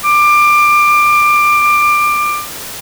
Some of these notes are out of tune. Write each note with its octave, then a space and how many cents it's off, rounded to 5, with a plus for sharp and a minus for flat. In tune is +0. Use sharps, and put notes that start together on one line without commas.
D6 +20